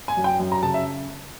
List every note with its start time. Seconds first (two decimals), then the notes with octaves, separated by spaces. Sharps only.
0.08 G#5
0.17 F#2
0.24 G5
0.39 F#2
0.52 A#5
0.63 C#3 A5
0.74 E5